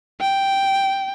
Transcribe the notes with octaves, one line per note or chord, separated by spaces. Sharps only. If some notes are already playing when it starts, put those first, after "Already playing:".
G5